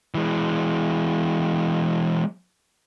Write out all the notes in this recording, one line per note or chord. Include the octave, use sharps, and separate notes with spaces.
E3 G#3